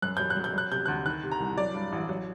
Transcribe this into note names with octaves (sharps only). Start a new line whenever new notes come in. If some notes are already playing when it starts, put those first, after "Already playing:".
F#2 F#6
F#3 G6
F#6
F#3
G6
F#3 F#6
C3 G6
D2 F#6
D#3 F#6
C3
A#5
C2
F#3 D5
G2
A1
F#3